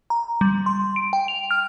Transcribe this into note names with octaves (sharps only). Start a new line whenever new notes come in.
A#5
G3
C6
D7
G5
F7
F6